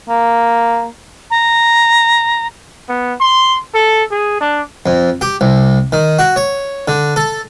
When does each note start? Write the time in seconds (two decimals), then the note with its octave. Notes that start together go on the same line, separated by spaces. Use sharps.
0.09 A#3
1.31 A#5
2.89 B3
3.20 C6
3.74 A4
4.11 G#4
4.41 D4
4.86 F2
5.21 G4
5.41 C2
5.92 D#3
6.19 F#4
6.36 C#5
6.88 D3
7.16 A4